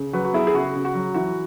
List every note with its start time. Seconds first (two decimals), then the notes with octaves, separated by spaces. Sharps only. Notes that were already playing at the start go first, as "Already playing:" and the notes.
Already playing: C#3
0.13 F#3 F#4 B4
0.24 F#4
0.33 B3 E4 G#4
0.47 G#4
0.53 C#3 F#4
0.75 C#3
0.85 F#4
0.94 F#3
1.14 E3 F#4